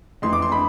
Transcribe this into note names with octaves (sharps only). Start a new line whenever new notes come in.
F2 E3 A3 C6
D6
C6
B5